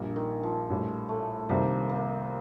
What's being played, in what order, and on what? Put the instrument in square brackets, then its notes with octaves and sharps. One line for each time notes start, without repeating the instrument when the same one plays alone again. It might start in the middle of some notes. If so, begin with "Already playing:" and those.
Already playing: [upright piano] A#1 A#2 G3 A#3 D4
[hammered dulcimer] D#3
F3
[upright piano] A#1 A2 G3
[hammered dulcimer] A3
[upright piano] C2 C3 D#3 G3 C4 [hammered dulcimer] A#3
[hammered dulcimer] A#3